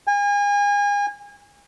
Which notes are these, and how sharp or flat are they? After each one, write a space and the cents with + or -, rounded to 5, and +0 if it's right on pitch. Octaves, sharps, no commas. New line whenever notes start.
G#5 -35